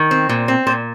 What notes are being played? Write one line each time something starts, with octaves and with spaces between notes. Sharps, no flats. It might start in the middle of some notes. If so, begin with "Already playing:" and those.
Already playing: D#3
C4
A#2
C4
A#2 C5